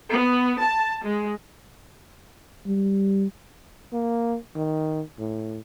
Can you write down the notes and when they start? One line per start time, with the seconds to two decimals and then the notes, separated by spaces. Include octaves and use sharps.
0.10 B3
0.61 A5
1.04 G#3
2.66 G3
3.93 A#3
4.56 D#3
5.19 A2